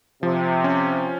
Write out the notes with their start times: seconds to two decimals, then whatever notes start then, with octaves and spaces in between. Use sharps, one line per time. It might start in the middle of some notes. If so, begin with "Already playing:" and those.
0.23 C3 F3
0.64 C#4